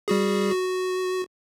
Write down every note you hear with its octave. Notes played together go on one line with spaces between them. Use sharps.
G3 F#4 G#4
F#4